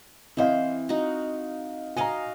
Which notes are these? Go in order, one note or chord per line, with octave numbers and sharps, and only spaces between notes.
E3 C4 C5 D#5 F5
D#4 F#4
F#4 D#5 F5 G#5 A#5